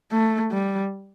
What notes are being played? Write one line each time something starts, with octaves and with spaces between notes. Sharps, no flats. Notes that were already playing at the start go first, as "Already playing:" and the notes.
A3
G3